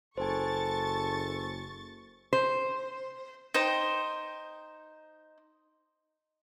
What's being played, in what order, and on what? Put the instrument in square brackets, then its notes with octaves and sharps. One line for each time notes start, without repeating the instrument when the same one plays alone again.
[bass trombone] F#1 [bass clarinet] A4 [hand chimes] C5 G#5 [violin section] C#6 A6
[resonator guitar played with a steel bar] C5
[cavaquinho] D#4 C5 G5